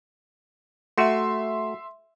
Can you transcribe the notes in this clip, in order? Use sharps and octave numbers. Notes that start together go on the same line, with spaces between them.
A3 F#4 E5 C6